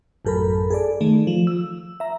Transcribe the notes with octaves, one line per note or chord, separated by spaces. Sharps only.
A1 F#2 A4 A#4 B5
G#4 A4 D5
D#3 A3
F3
E6
E5 A#5